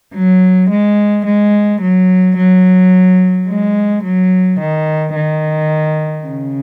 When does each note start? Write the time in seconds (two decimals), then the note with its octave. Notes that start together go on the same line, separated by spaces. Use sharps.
0.14 F#3
0.70 G#3
1.26 G#3
1.81 F#3
2.37 F#3
3.48 G#3
4.04 F#3
4.60 D#3
5.16 D#3
6.27 C#3